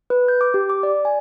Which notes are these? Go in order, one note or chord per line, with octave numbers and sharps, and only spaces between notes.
B4
G6
D6
G4
D6
D5
G#5